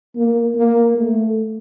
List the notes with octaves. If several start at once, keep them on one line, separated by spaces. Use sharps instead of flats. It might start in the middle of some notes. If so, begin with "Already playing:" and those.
A#3
A#3
A3